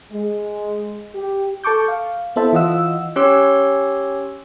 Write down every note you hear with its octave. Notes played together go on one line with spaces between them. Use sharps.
G#3
G4
A4 A5 C#6 D6 G6
F5
B3 E4 A4 C5 E5 A5
E3 F4 D#5 F#5 E6
C#4 G4 C#5 C6 E6